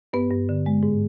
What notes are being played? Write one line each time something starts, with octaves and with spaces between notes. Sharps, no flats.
G2 B3 B4
G2
D3
G#3
G#2